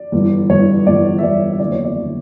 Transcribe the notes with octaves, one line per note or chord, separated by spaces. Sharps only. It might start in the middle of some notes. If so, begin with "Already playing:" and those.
Already playing: D5
G1 G2 E3
G1 G2 E3 C#5
G1 G2 E3 D5
E5
G1 G2 E3 D5
E5
F#1 E2 D3 D5
C#5
D5
D3